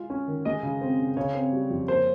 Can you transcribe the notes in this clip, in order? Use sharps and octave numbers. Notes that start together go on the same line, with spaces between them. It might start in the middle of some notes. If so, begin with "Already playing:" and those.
Already playing: G#3 F4
C#4
D#3
G#3 D#5
C#3
C4
C#3
C#3 C#5
C4
G3
F2
A#3 C5